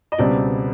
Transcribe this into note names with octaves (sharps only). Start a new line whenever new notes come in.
D#5
C#2 B2 G3 C4 D5